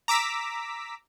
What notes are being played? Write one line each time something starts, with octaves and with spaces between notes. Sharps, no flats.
A#5 D6 E6 B6